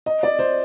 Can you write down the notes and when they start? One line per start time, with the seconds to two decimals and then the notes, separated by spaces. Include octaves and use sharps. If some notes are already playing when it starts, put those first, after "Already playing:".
0.06 D#5
0.23 D5
0.39 C5